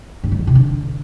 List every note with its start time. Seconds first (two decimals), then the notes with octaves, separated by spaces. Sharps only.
0.24 G2
0.31 G3
0.39 E3
0.47 C3
0.55 D3